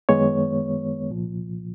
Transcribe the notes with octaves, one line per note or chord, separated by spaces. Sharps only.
F#2 D#3 G#3 B3 C#5
C2 A#2 F3